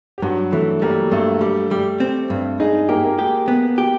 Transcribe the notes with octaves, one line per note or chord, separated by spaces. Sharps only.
G4
G2 F#3 F#4
E3 A3 A4
G3 A#3 A#4
G2 A3 A4
G3
G3
C4
G2
G#3 D#4 G#4
A#3 G4 A#4
A#3 A#4
G#3 G4 G#4
B3
G4